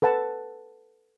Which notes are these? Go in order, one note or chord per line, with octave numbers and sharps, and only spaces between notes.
A4 B4 F#5 A5